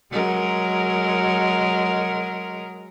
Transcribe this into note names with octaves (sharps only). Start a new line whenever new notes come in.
F#3 G#3 A#4